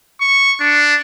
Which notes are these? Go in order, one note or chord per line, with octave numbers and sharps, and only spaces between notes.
C#6
D4